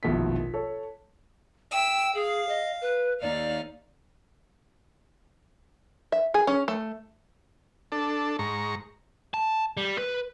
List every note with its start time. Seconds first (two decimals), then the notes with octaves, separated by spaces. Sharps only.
0.03 F1 A#1 B2 D#3 E4 B6
0.54 A4 C#5
1.72 E5 G5 E6
2.15 G#4 F5
2.49 D#5
2.81 B4
3.22 D#2 D#4 D5 F5
6.12 E5
6.34 G#4
6.47 C#4
6.68 A3
7.92 D4 A4
8.39 G#2 A#5 C#6
9.34 A5
9.77 G3
9.98 B4